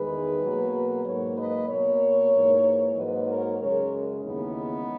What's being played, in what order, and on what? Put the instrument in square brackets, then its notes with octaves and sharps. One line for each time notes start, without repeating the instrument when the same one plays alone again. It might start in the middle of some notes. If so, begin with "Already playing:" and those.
Already playing: [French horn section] E2 D#3 G#3 G#4 B4
B2 F#3 A#3
G#2 F#3 A#3 A#4 C#5
B4 D#5
B2 A#3 A#4 C#5
G#2 E3 A#3
G#2 F#3 A#3 B4 D#5
A#4 C#5
F#2 C#3 G#3 A#4 C#5
D#2 C#3 E3 G#3 B3 D#4